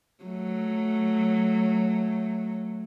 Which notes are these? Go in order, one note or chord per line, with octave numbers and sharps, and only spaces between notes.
F#3 A3